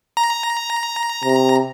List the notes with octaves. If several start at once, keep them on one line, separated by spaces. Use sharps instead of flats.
A#5
C3